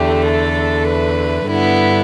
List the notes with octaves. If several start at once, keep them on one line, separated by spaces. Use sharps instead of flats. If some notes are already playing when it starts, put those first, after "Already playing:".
Already playing: E2 D3 A3 G4
A4
B4
G2 D3 B3 E4